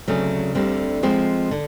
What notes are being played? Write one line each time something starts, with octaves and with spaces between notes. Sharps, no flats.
D2 C#3 F#3 A3 C4
D2 D3 G3 C4
F3 G#3 C4
D3